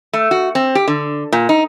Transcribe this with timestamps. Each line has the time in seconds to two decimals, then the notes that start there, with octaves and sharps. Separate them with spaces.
0.13 A3
0.31 F#4
0.55 C4
0.75 G4
0.88 D3
1.32 A#2
1.49 D#4